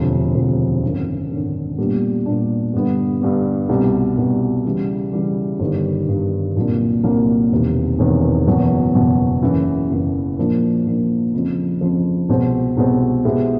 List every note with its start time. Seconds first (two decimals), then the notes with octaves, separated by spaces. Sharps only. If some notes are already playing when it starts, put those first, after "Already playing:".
Already playing: E1 D2 C3 F3
0.35 E1 D2 C3 F3
0.83 G#1 F#2 D3
1.30 G#1 F#2 D3
1.78 A#2 G3 B3 D4
2.26 A#2 G3 B3 D4
2.73 G2 D3 G3 B3
3.22 G2 D3 G3 B3
3.69 C2 B2 G3
4.17 C2 B2 G3
4.65 C#3 E3 G3
5.13 C#3 E3 G3
5.60 G1 G2 D#3 G3
6.08 G1 G2 D#3 G3
6.56 C2 A#2 F#3 A#3 D4
7.04 C2 A#2 F#3 A#3 D4
7.51 E1 E2 C3 D#3
7.99 E1 E2 C3 D#3
8.47 F#1 E2 B2 F#3
8.94 F#1 E2 B2 F#3
9.43 F#1 F#2 C#3 E3
9.90 F#1 F#2 C#3 E3
10.38 A#2 F3 A#3 D4
10.86 A#2 F3 A#3 D4
11.33 F2 C#3 F3
11.81 F2 C#3 F3
12.29 C2 B2 G#3 C4
12.77 C2 B2 G#3 C4
13.24 B2 G#3 B3 E4 G4